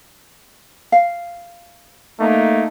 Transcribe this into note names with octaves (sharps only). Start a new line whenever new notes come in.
F5
A3 A#3 D#4